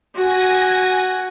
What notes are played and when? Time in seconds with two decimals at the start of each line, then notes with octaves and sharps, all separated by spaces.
0.15 F#4 G#5 A#6